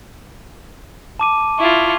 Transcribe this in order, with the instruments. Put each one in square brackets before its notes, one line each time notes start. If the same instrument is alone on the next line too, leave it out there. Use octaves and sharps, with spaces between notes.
[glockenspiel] A5 D6 D#7
[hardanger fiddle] E4 F4 [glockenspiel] C#6